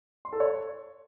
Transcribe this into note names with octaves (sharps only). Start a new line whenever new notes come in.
C6
A4
C#5